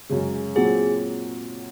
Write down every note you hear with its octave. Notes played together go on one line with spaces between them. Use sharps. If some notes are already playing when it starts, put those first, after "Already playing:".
F#2 C#3 G#3
A#2 F#3 C4 F#4 G#4